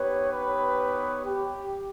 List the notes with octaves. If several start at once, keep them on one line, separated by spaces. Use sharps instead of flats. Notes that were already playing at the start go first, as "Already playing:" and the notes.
Already playing: B3 D#4 G4 B4 C#5
B4 C#5
G4